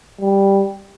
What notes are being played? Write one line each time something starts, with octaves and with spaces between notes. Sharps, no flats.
G3